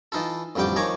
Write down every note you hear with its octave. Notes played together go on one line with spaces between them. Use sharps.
E3 D#4 F4 A4
A1 F2 D3 G3 G5 D6
D#3 F3 C#5 G#5 A#5 D6